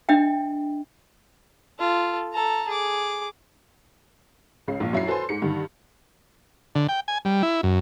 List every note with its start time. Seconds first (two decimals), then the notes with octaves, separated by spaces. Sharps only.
0.09 D4 D#5 E5 G5
1.79 F4 A4
2.33 A4 A#5
2.68 G#4 D6
4.68 C#2 C#3 C7
4.80 A#1 A#2
4.93 F#2 E4 F#4 C7
5.07 F#4 A4 B4 C5 G#5 C6
5.29 G#2 G#3 C#7
5.42 G2 D3 D#3
6.75 D3
6.89 G5
7.08 G#5
7.25 G3
7.43 E4
7.63 F#2